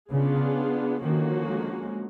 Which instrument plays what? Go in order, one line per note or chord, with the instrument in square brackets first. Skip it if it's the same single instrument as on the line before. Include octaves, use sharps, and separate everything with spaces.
[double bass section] C#3 [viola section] B3 D4 F4 G#4
[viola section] D3 F3 A#3 C#4 F#4 [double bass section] D#3
[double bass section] G#3